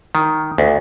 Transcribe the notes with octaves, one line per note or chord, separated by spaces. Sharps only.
D#3
D2